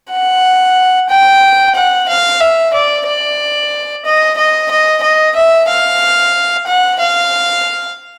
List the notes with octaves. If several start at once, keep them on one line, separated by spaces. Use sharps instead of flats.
F#5
G5
F#5
F5
E5
D5
D5
D#5
D#5
D#5
D#5
E5
F5
F#5
F5